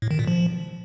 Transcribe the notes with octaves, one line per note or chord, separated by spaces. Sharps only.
A2
D#3
A#2
F3